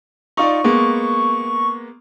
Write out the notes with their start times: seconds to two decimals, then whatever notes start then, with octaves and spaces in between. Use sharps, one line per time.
0.37 D#4 F4 D5 C#6
0.64 G#3 A#3 B3